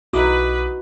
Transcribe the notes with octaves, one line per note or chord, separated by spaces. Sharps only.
B1 D#4 E4 F#4 B4 D6 D#6